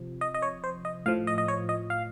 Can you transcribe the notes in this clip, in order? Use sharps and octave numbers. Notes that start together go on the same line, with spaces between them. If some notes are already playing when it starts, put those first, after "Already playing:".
Already playing: C3 F3
D#5
D#5
C#5
C5
D#5
A2 F3 F5
D#5
D#5
C#5
D#5
F5